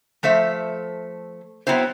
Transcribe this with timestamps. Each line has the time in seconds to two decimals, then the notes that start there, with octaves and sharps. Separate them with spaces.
0.23 F3 A3 C5 E5
1.67 F#3 B3 C4 E4 C5